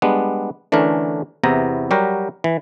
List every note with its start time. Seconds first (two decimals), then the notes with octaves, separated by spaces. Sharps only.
0.02 G3 G#3 B3 D4
0.72 D3 E3 A3 C#4 D4 A#4
1.43 E2 C3 B3 E4 A#5
1.91 F#3 G3 F#4 G4 A#4
2.44 E3